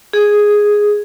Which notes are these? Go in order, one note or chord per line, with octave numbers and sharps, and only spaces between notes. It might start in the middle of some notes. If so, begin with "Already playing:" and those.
G#4